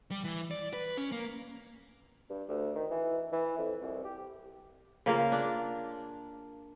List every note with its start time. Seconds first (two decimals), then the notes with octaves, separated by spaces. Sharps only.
0.11 G3
0.24 E3
0.51 D5
0.73 B4
0.97 C#4
1.12 A#3
2.30 G2
2.48 D2
2.75 D#3
2.91 E3
3.32 E3
3.58 F2
3.81 C2
4.04 G4
5.06 C#3 A#3 F4 A#4
5.32 D4